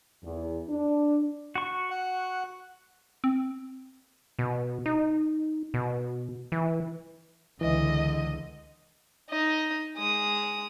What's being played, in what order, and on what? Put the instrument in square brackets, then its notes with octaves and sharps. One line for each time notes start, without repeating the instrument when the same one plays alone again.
[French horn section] E2
D4
[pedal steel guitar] F#4 C#6
[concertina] F#5
[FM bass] C4
[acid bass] B2
D#4
B2
E3
[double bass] C#2 D3 [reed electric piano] E3 [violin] D#5
[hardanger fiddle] D#4 D#5
G#3 D#6